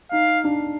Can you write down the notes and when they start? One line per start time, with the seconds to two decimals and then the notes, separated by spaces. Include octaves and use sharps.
0.12 D#4 F5
0.44 D4